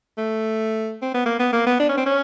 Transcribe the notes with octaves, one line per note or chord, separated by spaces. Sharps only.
A3
C4
B3
A#3
B3
A#3
B3
D4
C#4
C4
C#4